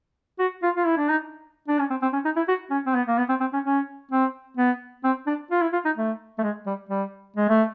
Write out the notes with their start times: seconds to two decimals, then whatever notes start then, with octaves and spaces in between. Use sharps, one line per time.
0.39 F#4
0.63 F4
0.77 F4
0.86 E4
0.98 D4
1.09 D#4
1.68 D4
1.79 C#4
1.90 C4
2.02 C4
2.13 C#4
2.25 D#4
2.36 E4
2.48 F#4
2.71 C#4
2.86 C4
2.95 B3
3.07 A#3
3.18 B3
3.29 C4
3.40 C4
3.53 C#4
3.65 C#4
4.11 C4
4.57 B3
5.04 C4
5.27 D4
5.51 F4
5.62 E4
5.73 F4
5.85 D#4
5.97 A3
6.38 A3
6.43 G#3
6.66 G3
6.89 G3
7.36 G#3
7.49 A3